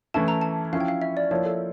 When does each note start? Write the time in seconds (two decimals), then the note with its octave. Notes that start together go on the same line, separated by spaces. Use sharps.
0.14 E3 A3 C#4 E4 A5
0.28 A#5
0.41 A5
0.73 F3 C#4 E4 F5
0.80 G5
0.88 F5
1.02 E5
1.17 D5
1.31 F3 A#3 E4 C#5
1.45 A4